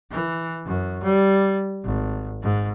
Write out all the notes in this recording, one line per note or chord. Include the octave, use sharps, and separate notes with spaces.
E3
F#2
G3
G#1
G#2